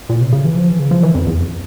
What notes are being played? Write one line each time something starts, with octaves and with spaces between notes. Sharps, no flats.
A#2
C3
C#3
E3
F3
E3
C#3
F3
E3
F2
E2
F2